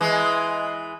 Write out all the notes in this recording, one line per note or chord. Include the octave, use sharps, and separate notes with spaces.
E3 G#3